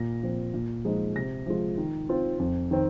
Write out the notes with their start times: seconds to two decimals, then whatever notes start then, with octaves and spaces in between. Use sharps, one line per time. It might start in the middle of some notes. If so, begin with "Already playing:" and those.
Already playing: A#2 A#6
0.23 F3 C4
0.54 A#2
0.85 F3 G#3 D#4
1.16 C3 A#6
1.47 F3 G#3 F4
1.78 D#3
2.09 C4 F4
2.39 F2
2.71 D#3 C4